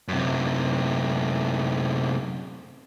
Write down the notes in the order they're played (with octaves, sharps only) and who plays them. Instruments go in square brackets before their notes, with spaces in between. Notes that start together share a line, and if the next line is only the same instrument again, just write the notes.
[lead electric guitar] F#2 C3